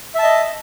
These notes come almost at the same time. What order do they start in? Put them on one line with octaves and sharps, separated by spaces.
E5 A5 D#5